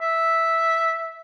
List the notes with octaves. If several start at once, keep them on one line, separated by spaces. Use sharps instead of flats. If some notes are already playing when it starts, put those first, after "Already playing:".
E5